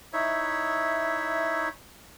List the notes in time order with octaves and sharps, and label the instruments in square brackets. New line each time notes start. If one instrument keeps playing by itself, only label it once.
[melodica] D#4 E4 C#5 E5